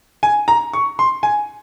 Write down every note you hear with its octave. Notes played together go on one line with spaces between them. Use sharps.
G#5
A#5
C#6
C6
G#5